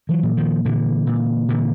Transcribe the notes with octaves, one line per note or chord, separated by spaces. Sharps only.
E3 F#3
A#2
D#3 F3
A#2 D3 E3
A#2
A#2 D3 E3